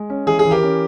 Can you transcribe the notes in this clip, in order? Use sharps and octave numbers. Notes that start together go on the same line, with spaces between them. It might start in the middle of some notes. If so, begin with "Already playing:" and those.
Already playing: G#3
C#4
E3 G#4
G#4
E3
G4 A#4
C#4